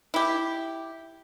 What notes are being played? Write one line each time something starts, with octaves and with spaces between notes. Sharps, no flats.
E4 G4